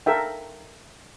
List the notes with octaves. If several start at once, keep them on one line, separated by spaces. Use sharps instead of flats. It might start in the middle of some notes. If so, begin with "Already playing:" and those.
A4 A#4 E5 F5 G5